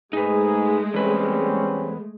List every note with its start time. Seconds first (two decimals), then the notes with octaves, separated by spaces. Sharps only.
0.13 G#2 G#3 A3 D#4 G#4 B4
0.94 E2 G3 C4 C#4 B4